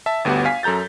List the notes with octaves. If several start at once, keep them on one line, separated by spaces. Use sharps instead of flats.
E5 A5
G1 D2 B3 G4 F#5
F5 G#5 B6
F#2 A4 A#5 G6 A6